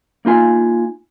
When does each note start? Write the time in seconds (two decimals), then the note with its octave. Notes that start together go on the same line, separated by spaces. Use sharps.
0.25 A#3 D#4 F4 G#5